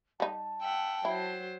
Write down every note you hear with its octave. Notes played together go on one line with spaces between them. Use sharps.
G3 D#4 A5
E5 F#5 G5
F#3 E4 C5